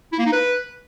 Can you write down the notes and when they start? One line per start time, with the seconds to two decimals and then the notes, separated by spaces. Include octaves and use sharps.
0.12 E4
0.19 A#3
0.26 D#4
0.32 B4